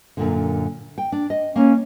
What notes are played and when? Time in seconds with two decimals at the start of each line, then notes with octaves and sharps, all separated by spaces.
0.17 F#2 A#2 D3
0.98 G5
1.12 D4
1.30 D#5
1.56 A#3 C#4